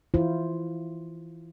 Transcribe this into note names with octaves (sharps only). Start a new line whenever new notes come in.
E3 E4 F4 C5